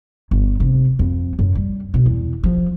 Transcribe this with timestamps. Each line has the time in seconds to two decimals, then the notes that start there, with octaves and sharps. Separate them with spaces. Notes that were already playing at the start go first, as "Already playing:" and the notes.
0.31 G1
0.60 C3
0.99 F2
1.39 F#2
1.55 G3
1.94 B2
2.06 E2
2.44 F3